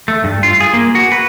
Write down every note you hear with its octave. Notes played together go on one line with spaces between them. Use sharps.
A3
G2
F4
G#4
A#3
F#4
B4